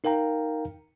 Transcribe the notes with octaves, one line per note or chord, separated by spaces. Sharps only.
D#4 A#4 F5 G5 A#5